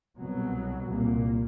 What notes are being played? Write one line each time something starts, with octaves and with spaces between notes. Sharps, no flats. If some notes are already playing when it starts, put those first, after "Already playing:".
C2 B2 F#3
C2 A#2 A#3